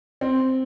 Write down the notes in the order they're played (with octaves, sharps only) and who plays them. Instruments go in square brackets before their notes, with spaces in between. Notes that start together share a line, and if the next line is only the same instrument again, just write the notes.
[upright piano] C4